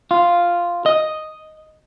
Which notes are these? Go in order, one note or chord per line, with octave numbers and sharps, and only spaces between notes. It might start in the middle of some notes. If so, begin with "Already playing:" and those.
F4
D#5